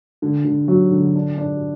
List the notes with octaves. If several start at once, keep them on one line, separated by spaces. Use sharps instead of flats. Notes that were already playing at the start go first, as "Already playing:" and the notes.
D3
D3
F#3
D3
D4
D4